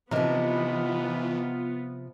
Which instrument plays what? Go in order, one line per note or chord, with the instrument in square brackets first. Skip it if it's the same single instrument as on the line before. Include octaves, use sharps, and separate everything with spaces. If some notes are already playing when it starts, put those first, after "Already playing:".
[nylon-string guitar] C3 F3 [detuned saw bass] E3 [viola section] B3 F4 [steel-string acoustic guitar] D#4 G4 A#4